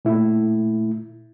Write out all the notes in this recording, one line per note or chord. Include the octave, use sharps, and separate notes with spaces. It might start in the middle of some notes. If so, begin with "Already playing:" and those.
A#2 A3 E4